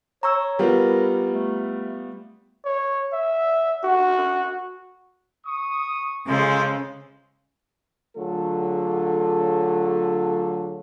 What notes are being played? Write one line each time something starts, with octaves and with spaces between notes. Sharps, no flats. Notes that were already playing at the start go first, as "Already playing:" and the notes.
C#5 A#5 C#6 E6
G3 B3 F4 A#4
A3
C#5
E5
F#4
C#6 D#6
C#3 G#3 F4 A4 C5
D3 F#3 A3 F4 G#4 A4